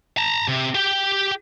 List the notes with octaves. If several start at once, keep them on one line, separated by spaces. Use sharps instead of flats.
A5 A#5
C3
G4 G5